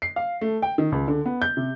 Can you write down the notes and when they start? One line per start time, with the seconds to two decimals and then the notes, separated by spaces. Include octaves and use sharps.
0.02 C7
0.16 F5
0.41 A3
0.62 G5
0.78 D#3
0.92 C#2
1.08 D3
1.26 B3
1.42 G6
1.57 C3